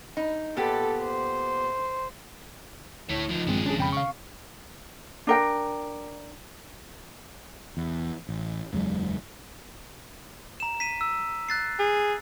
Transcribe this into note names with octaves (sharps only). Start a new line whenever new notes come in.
D#4
A#2 B3 G4 A4
C5
D2 E4 C#5
F3 D#4
A#1 G2 D#3 F3 G#3 C4 G#4
F2 C#4 D4 G#4
F2 C#3 G5 B5
F5 C#6
D4 A#4 G5
E2
A1
F#1 E2 F#3 G#3
A#5 E7
B6 D#7
E6
F#6 A6 C7
G#4